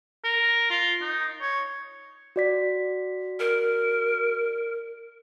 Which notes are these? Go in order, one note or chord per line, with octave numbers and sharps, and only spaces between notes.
A#4
F4
D#4
C#5
F#4 D5 B6
A#4